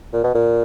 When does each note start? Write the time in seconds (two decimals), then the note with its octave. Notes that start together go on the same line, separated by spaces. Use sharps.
0.13 A#2
0.24 B2
0.35 A#2